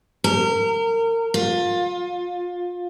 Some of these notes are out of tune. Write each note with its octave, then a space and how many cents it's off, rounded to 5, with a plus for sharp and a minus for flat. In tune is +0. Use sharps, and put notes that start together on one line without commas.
A#4 -30
F4 +25